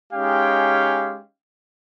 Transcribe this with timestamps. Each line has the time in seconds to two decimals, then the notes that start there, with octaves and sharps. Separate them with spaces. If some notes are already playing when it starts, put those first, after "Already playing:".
0.13 G#3 C#4 D#4 G4 F5 G5